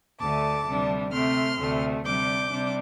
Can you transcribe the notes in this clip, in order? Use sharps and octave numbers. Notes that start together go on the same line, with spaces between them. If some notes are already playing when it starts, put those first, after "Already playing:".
D2 D3 A3 A5 D6
D2 C3 G3 D4
C3 A3 C4 C6 F6
D2 C3 A3
C3 G3 D4 D6 G6
C3 G3 D4